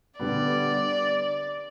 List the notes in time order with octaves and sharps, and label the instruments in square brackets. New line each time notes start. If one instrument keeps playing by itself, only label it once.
[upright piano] D3 G3 B3 [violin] D5